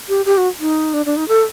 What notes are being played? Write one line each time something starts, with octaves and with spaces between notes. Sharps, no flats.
G4
G4
F#4
D#4
D4
D4
D#4
A4